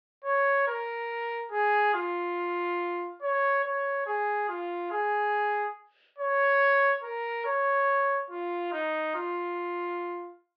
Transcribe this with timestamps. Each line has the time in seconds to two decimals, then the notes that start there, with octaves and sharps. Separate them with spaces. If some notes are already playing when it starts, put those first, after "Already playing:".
0.25 C#5
0.68 A#4
1.52 G#4
1.95 F4
3.22 C#5
3.64 C#5
4.06 G#4
4.49 F4
4.91 G#4
6.19 C#5
7.04 A#4
7.46 C#5
8.31 F4
8.73 D#4
9.15 F4